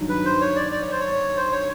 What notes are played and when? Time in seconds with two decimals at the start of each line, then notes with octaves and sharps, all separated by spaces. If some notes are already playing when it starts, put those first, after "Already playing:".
Already playing: G2 D#3 F#3
0.09 B4
0.25 C5
0.41 C#5
0.56 D5
0.72 D5
0.82 C#5
0.91 C5
1.01 C#5
1.37 C5
1.52 C#5